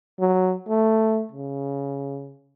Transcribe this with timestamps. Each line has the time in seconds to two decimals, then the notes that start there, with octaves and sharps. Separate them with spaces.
0.20 F#3
0.68 A3
1.32 C#3